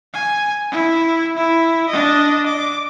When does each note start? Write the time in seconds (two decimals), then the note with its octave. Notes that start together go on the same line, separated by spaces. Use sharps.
0.14 G#5
0.72 E4
1.37 E4
1.89 D4 D#5
2.47 D6